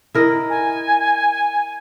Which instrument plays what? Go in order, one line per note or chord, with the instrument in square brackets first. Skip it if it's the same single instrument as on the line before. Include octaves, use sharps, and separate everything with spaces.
[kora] E4 A#4 D#5
[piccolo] G#5